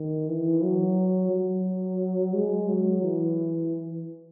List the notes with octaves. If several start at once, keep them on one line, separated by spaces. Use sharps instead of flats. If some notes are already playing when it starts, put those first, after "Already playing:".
Already playing: D#3
E3
F#3
F#3
G#3
F#3
E3